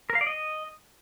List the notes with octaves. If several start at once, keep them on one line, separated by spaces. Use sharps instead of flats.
A#4
F5
D5
D#5